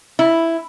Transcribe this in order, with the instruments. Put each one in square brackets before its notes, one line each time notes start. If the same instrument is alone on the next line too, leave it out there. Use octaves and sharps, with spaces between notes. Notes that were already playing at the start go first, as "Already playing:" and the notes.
[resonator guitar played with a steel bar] E4